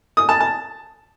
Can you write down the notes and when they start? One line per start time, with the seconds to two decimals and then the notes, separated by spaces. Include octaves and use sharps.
0.17 D#6
0.29 A5
0.40 A5